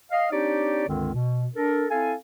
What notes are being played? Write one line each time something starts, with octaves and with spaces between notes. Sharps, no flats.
D#5 F5
C4 D4 D#4 G4 C#5 D5
C#2 G2 D3 D#3 G#3 C4
B2
D4 A4 A#4
C4 E4 A4 F5 G#5